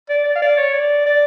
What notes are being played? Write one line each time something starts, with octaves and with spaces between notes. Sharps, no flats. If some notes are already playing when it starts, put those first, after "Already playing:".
D5
D5
F5
D5
C#5
D5
D5